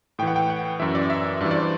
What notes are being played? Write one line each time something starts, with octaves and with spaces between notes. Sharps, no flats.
A2 E3 G5
F#5
G5
F#5
F#2 E3 E5
D5
E5
G2 E3 D5
D5
C5